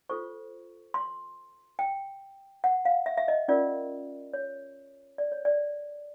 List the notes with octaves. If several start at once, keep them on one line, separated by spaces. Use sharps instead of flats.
F4 A4 C5 C#6
C6
G5
F#5
F5
E5
E5
D#5
C#4 F4 A#4 D5
C#5
D5
C#5
D5